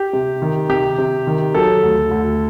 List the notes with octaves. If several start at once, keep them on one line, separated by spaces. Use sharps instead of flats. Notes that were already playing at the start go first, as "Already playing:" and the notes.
Already playing: G4
C3
D#3
C3 G4
C3
D#3
F#3 A4
D2
D2